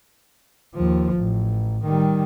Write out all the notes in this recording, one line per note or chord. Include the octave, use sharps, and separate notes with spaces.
D#2 F3
A1
D#3 G3